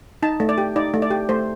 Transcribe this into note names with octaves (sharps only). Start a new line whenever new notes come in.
D#4 A5
A3
D5
G4
D#4 D5
A3
D5
G4
A3 C5